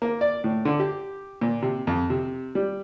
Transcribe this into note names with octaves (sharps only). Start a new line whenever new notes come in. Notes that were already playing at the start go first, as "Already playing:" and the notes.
A#3
D5
A2
D3
G4
A#2
C3
F2
C3
G3